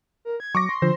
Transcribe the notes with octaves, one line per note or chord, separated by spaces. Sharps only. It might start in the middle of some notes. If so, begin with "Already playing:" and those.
A#4
G#6
F#3 C#6 D6 A#6
C6
D3 F3 C5